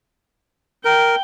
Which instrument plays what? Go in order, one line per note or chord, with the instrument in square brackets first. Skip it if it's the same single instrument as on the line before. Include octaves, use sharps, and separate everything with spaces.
[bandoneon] A#4 [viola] G5